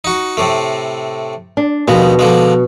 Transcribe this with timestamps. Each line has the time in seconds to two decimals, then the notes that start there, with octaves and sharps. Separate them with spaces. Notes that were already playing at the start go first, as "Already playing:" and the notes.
0.04 D#4 F#4
0.37 A2 C3 A3
1.57 D4
1.88 D#2 B2 F3 G#3
2.19 D3 F3 G#3